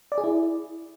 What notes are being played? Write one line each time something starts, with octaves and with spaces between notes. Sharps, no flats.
D5
G#4
E4